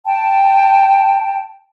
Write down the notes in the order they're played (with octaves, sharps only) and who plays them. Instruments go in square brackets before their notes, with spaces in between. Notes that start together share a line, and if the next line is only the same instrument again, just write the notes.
[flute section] G5 A5